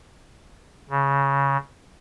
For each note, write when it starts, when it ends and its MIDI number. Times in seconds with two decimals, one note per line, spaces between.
0.90 1.57 49